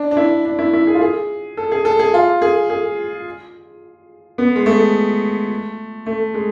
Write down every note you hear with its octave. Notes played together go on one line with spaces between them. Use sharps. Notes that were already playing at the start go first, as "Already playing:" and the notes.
Already playing: D4
D4
E4
D4
E4
E4
G#4
F4
G#4
A4
G#4
A4
G#4
F4
G#4
G#4
B3
G#3
A3
A3
G#3